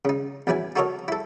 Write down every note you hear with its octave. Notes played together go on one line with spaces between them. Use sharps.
C#3 D#4
E2 F#3 E4 B4 G#5
D#4 F#4 A4 A#4 C#5 D#5
E4 A4